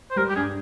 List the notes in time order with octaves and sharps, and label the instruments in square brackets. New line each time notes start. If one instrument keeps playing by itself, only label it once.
[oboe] C5
[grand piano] G3 [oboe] A#4
[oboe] G4
[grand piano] G2 [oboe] G#4